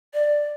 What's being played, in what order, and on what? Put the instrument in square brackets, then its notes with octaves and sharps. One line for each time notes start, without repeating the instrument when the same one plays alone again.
[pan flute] D5